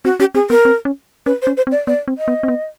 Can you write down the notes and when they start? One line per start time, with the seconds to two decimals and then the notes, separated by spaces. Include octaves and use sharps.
0.05 C4 F#4
0.20 C#4 G4
0.35 C4 G#4
0.50 B3 A#4
0.65 C4
0.85 C#4
1.26 C#4 B4
1.42 C5
1.47 C#4
1.57 C5
1.67 C4
1.72 D5
1.87 B3 D5
2.08 C4
2.18 D#5
2.28 B3
2.43 C4
2.48 B3